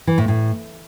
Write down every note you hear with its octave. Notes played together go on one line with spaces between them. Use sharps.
E3
A2
A2